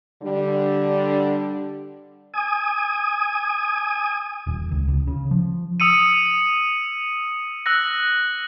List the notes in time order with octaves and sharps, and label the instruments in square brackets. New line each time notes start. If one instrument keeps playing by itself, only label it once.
[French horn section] D3 G3 D4
[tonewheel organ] G#5 D#6
[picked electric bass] D#1
C#2
C#2
C#3
F3
[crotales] D#6 E6 C#7 D#7
E6 F#6 A#6